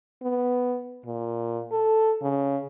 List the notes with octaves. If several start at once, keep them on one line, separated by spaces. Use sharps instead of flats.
B3
A#2
A4
C#3